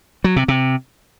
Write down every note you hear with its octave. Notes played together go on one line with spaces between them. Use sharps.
F#3
C3
C3